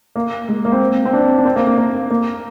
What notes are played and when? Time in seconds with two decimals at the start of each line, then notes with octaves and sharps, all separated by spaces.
0.16 A#3
0.49 G#3
0.65 A#3
0.72 C4
1.05 C4
1.13 D4
1.38 D4
1.45 C4
1.56 A#3
1.67 A#3
1.78 A#3
2.11 A#3